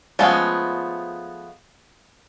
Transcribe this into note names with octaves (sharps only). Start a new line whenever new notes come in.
F3 G#3 A3 B3 C#4